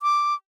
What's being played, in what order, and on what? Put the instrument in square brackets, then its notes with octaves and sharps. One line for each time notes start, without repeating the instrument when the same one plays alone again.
[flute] D6